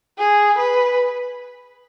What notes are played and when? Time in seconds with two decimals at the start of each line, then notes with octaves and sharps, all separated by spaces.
0.18 G#4
0.58 B4